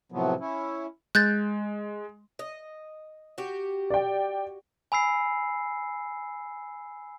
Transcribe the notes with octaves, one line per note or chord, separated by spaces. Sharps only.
A2 C3 F3 F#3 B3
C#4 E4
G#3 F#6 G6 A6
D#5
F#4 G4
D5 G5
G#5 B5 E6 C7